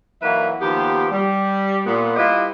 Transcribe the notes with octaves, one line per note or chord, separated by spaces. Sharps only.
E3 F#3 A#3 D#4 B4 E5
D#2 F3 B3 G4
G3
A#2 B3
G3 E4 F4 G4 B4 D#5